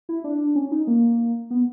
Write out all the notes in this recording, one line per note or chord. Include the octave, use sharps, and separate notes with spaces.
E4
D4
C#4
D#4
A#3
B3